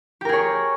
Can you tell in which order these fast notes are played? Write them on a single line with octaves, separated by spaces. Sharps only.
G4 A#4 G#4 C#5